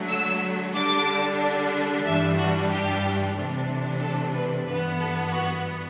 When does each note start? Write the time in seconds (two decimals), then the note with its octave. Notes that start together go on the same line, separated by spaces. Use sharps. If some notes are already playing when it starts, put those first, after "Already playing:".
Already playing: D3 F#3 A3
0.08 E6
0.74 D3 G3 D4 D6
2.05 G2 E3 G3 D4 E5
2.38 F#4
2.70 G4
3.36 C3 E3 A3 D4
4.02 A4
4.34 B4
4.67 G2 E3 B3 B4
4.99 A4
5.32 F#4